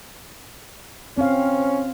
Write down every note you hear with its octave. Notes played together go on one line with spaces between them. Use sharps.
C4 C#4 F5